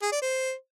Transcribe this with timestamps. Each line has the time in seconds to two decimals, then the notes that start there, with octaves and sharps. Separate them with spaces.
0.02 G#4
0.12 D5
0.22 C5